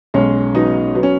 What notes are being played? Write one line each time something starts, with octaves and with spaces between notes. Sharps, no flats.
B1 G#3 C#4
F#3 B3 D#4
F#3 B3
C#4